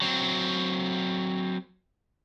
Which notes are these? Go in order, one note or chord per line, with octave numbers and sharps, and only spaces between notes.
F#3 C4